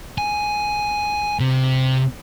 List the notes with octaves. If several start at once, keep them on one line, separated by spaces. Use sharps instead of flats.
G#5
C3